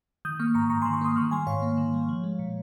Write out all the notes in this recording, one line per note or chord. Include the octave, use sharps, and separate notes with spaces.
D#3 D#6 G6
A#3 C#6 F6
G#2 A#5 C#6
G#2 A#5 C#6
D#3 G#5 C6
A#5 C#6
A#3 C6 D#6
D#3 C#6 F6
G3 G#5 C6
G#2 C#5 F5
A#3
D#3
G3
F3
G#3
A#2